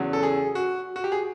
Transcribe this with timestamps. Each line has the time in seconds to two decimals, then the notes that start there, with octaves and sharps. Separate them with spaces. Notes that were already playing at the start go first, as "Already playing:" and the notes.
Already playing: E2 C#3 F#3
0.13 A4
0.23 G#4
0.55 F#4
0.96 F#4
1.04 G4
1.12 G#4